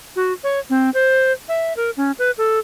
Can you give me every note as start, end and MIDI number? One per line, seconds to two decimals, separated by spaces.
0.16 0.33 66
0.44 0.59 73
0.70 0.90 60
0.94 1.32 72
1.49 1.73 76
1.77 1.90 70
1.97 2.12 61
2.19 2.31 71
2.38 2.59 69